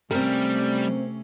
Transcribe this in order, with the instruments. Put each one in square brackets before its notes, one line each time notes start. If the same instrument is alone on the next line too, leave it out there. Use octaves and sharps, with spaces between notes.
[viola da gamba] C3 A3 C#4 [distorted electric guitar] G3 [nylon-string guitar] C4 A#4